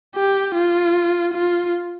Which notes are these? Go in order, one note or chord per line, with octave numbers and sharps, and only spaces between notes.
G4
F4
F4